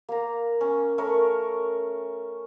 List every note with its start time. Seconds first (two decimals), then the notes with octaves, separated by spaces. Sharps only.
0.09 A#3 A#5
0.61 C#4
0.98 A3 A#4 C#5